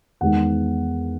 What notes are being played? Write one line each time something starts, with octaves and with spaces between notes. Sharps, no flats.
E2 D#3 G#3 B3 F#5